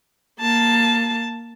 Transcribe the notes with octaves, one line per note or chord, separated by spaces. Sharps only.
A#3 A5